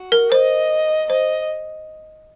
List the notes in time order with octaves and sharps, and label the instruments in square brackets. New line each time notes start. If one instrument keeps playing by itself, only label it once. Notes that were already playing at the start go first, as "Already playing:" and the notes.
Already playing: [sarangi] F#4
[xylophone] A#4
[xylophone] C5 [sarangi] D#5
[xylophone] C5 [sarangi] D#5